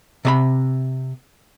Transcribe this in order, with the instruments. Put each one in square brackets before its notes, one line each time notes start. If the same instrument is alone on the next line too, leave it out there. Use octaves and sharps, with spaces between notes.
[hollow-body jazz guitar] C3 D5 B5